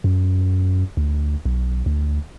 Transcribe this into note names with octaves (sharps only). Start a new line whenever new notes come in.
F#2
D2
B1
D2